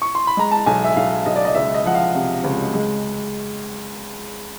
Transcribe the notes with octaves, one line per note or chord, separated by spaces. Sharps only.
C#6
C6
B5
G#3 A#5
A5
B1 G#5
E5
B1 F5
B1 D#5
D5
D#5
C#2 E5
D#5
F3 F#5
F5
C3
C#2
G#3